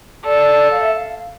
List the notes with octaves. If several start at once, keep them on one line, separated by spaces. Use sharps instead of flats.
A4 D5
F5
E5
F5